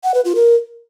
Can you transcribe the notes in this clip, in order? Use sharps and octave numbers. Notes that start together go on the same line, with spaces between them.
F#5
B4
F4
A#4